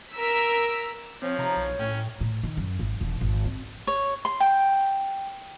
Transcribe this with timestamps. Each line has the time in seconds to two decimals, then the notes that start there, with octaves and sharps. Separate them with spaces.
0.15 A#4 E6 B6
1.22 F3 C4 C#5
1.38 C3 D#4 A#5 B5
1.57 B1
1.79 A2 C#4 G5
2.21 A2
2.44 D#3
2.57 F#2
2.79 G#1
3.01 E1
3.21 G#1
3.45 C4
3.87 C#5
4.25 C6
4.40 G5